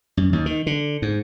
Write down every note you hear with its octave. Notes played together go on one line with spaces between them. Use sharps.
F#2
D#2
D#3
D3
G#2